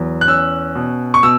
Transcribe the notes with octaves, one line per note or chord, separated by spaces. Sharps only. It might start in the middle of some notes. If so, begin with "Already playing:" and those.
Already playing: E2 F#3
F#6
C#4 E6
B2
C#6
B2 E6